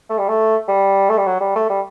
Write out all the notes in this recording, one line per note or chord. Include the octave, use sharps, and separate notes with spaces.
A3
G3
A3
G3
A3
G3
F#3
G3
A3
G3